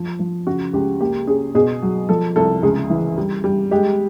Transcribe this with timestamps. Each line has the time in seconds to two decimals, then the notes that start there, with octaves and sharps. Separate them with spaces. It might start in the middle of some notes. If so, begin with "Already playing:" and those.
Already playing: F3
0.19 F3
0.47 C#3 F#4
0.73 C#2 G4
1.00 A#3 G4
1.27 C#4 G#4
1.55 B2 G#4
1.82 F#3
2.09 F3 A4
2.36 C2 A4
2.63 C#2 G#4
2.90 E3
3.18 G3
3.44 G3
3.71 G#3 G4